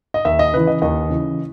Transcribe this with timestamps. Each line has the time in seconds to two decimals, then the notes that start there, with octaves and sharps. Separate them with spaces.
0.14 D#5
0.25 D#2 E5
0.39 D#5
0.53 C#3 E3 B4
0.67 D#5
0.82 D#2 D#5
1.10 C#3 E3